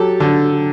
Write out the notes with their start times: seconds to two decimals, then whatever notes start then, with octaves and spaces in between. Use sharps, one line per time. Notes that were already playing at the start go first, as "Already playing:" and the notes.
Already playing: F#3 G4 A4
0.20 D3